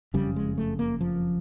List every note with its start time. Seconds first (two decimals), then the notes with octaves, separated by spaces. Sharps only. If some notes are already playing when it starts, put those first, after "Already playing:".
0.14 F#1 F2 C#3 G3
0.36 G#3
0.58 A3
0.79 A#3
1.01 F3